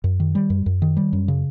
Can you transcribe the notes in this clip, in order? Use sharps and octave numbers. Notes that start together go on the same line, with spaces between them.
F#2
D#3
G3
F#2
F#2
D#3
G3
F#2
C#3